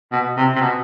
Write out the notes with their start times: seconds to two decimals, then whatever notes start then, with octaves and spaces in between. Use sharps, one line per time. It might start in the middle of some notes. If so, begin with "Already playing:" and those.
0.12 B2
0.37 C3
0.55 C3
0.61 B2